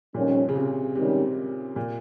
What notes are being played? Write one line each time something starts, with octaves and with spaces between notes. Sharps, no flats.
F2 A#2 D#3 G3 C#4
C#3
C3
G#2 C3 D#3 G3 C#4
A#2